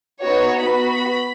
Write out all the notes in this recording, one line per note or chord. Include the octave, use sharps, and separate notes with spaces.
B3 D#4 F#4 C#5
B3 F#4 B5